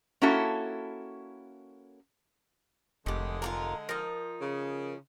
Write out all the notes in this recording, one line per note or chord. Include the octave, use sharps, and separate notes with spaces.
A#3 C#4 E4 F#4 A4
F1 D3 D#3 G#3 G4
F4 F#4 A#4
F3 D#4 A#4
C#3